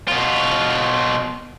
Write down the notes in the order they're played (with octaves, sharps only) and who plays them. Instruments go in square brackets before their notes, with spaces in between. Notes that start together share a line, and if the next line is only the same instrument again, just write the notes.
[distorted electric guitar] B2 F4